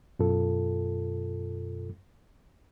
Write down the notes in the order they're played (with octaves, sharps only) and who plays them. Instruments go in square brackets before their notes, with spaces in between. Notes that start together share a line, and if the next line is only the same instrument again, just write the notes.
[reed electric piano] F#2 B2 F4 A4